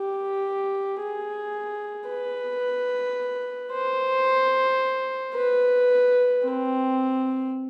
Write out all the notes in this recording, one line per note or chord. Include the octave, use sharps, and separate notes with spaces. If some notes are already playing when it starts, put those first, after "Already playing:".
Already playing: G4
G#4
B4
C5
B4
C4